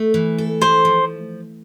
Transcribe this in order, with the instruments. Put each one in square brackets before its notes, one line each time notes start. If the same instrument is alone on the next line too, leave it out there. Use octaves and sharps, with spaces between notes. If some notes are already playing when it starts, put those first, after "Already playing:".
Already playing: [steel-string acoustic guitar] A3
E3
A4
[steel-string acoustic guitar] A3 [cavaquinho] C5
[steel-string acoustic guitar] F3